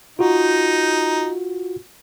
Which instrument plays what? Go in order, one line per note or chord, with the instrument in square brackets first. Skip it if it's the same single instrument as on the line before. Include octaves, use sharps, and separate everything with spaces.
[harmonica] D#4 [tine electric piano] F4 F#4